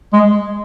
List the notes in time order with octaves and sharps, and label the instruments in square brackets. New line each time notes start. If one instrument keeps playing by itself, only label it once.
[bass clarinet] G#3